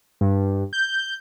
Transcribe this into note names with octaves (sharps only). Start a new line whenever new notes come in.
G2
G6